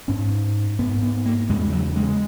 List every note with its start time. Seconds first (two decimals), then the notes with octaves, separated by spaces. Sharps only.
0.08 G#2 C#4
0.79 G#2 B3
1.03 B3
1.26 A#3
1.49 E2 C#3 G#3
1.72 F#3
1.96 G#3